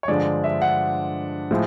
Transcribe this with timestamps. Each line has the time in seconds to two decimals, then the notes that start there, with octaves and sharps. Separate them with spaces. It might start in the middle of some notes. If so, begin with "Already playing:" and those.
0.03 C#5
0.08 G2 D3 F3 G#3 D5
0.44 E5
0.62 F#5
1.51 A2 F3 G#3